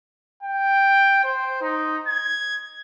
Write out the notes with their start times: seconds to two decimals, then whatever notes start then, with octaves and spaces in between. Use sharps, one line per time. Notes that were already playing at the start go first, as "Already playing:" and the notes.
0.43 G5
1.24 C5
1.62 D#4
2.08 G#6